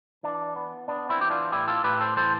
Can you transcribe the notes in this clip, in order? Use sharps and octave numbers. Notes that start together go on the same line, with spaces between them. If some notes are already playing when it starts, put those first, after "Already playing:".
E3 D4
B3
B3 D4
C4 E4
E3 G4
D4 F4
A2 E4 G4
F4 A4
A2 G4 B4
A4 C5
E3 A4 C5